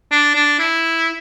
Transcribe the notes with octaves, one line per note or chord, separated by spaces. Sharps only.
D4
D4
E4